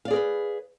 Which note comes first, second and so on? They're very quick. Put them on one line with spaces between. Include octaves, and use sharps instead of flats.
F5 D5 G#4 A#4 B4